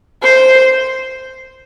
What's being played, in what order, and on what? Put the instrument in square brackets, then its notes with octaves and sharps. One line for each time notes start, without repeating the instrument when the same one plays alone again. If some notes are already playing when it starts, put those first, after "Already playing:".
[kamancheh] C5